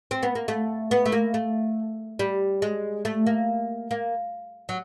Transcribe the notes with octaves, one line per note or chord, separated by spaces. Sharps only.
C4
B3
A#3
A3
B3
A3
A#3
A3
G3
G#3
A3
A#3
A#3
F#3